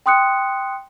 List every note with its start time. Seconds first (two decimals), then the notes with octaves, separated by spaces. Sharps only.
0.06 G5 C6 D#6 F#6 C#7